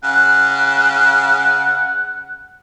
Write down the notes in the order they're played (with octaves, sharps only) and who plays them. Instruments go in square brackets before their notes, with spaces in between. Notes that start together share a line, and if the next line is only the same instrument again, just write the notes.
[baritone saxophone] C#3 [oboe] F#5 [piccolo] F#6